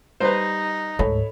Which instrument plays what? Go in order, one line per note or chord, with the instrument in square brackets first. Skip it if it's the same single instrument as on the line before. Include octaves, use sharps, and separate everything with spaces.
[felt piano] G3 [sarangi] D#4 [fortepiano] B4 C5
[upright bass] D2 G#2 [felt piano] A4 C#5 B5